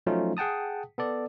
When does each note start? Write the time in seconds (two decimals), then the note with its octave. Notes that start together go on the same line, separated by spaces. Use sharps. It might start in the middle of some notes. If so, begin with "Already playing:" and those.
0.07 F3 F#3 A3 C#4 D#4 F4
0.37 G#4 F#5 G5 A5 D#6
0.98 B3 A4 D5